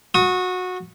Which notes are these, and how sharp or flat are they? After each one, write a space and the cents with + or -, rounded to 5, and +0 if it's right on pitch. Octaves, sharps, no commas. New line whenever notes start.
F#4 -20 D#6 +25